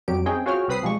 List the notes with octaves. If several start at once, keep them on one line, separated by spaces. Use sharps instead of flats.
F2 F#3 G3 G4 D7
C4 C#4 D#4 G#4 G5
F4 F#4 G#4 C#5 G5 F6
C2 C4 B4 B5 D#6 C7
B1 F3 G3 G#3 C#6